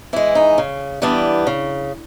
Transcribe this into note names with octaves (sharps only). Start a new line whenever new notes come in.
E3 G#3 E4
D#4
C#3
E3 G3 B3 D4
C#3